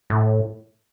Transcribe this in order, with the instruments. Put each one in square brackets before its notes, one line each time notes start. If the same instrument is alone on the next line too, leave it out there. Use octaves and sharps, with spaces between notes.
[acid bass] A2